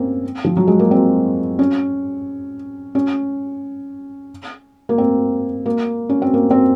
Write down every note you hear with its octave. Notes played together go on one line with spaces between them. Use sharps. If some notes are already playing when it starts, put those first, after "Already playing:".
Already playing: A#3 C4 C#4
F3
F#3
G#3
A#3
C4
C#4
C#4
A#3
C4
A#3
C#4
C4
A#3
C4